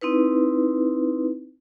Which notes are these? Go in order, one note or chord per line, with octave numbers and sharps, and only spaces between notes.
C4 D#4 E4 B4